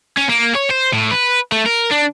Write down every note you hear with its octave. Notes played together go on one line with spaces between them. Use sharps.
C#4
A#3
C#5
C5
A2
B4
A3
A#4
D4